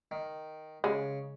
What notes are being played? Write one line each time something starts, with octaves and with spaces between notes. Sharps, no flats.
D#3
C#3 G#3